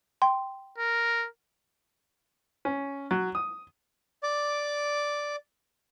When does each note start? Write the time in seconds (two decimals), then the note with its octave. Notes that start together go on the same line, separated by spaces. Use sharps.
0.22 G5 C6
0.78 A#4
2.65 C#4
3.11 F#3
3.35 D#6
4.23 D5 D6